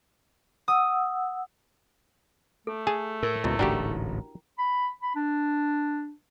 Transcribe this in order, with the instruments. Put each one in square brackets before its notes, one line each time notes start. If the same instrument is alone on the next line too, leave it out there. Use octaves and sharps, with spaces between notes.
[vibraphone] F#5 E6 [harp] D#6
[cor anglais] A3 [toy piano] A4
[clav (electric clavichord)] G#4 G#5 A5
[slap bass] A2 [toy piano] A#4
[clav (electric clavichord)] C#2 B2 [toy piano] E4
[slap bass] D1 A1 G#2 [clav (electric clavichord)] D4 F#4 G4 [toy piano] G5 A#5
[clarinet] B5
B5
D4